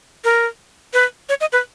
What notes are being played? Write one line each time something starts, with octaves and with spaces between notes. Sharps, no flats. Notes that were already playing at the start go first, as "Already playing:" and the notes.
A#4
B4
C#5
D#5
B4